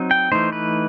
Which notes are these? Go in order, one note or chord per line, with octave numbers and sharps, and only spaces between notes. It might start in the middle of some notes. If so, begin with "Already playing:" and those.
Already playing: F#3 C4 D#4
G5
E3 A3 D#4 C5
B4